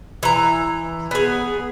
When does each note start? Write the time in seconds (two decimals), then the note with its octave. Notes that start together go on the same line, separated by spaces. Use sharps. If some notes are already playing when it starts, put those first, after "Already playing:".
0.23 E3 A#5
1.11 B3 G#4